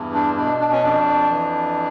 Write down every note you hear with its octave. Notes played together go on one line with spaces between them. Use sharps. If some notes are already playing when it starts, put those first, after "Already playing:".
Already playing: E2 G2
D4
B2 D4
D4
C#4
F2 D4
E3